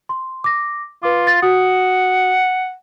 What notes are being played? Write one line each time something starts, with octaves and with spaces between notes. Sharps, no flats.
C6
D6 A#6
F4 B4 D6
A6
F#4 F#5 D#6